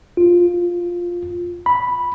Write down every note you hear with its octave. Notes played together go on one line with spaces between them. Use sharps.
F4
B5